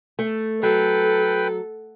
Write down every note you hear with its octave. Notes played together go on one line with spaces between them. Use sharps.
A3
F#3 A4 B4 G5